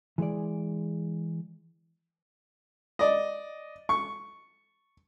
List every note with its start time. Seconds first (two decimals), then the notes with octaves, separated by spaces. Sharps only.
0.18 E3 G#3 G#4 D5
2.99 D5 D#5
3.89 C#6